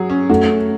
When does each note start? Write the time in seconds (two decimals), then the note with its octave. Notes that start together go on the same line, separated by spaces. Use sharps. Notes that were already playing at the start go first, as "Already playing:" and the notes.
Already playing: F#3 G#4
0.10 C#4
0.29 A3 F#4
0.50 C#4